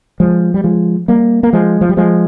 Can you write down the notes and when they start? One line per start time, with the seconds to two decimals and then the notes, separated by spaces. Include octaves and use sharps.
0.20 F3 G#3
0.54 G3
0.64 F3 G#3
1.08 G3 A#3
1.43 A#3
1.53 F3 G#3
1.81 F3
1.89 G3
1.97 F3 G#3